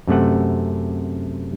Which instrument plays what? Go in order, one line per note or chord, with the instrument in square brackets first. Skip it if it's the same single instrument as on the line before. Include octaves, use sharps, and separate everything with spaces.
[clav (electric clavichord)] F#2 C3 A3 F#5